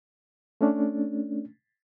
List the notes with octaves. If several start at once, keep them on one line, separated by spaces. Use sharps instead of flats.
A3 C#4 D4